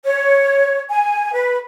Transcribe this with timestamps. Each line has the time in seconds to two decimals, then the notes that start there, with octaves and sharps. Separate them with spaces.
0.05 C#5
0.89 G#5
1.33 B4